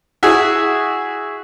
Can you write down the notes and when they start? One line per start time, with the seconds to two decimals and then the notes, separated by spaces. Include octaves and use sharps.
0.23 E4 F#4 G#4